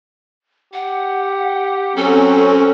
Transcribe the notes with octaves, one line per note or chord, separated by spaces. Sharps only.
G4 F#5
F#3 C4 C#4 A4